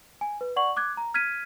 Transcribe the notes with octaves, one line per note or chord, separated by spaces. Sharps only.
G#5
B4
D5 F#5 C#6 F#7
D6 F#6 G#6
A#5
F6 G#6 B6 D#7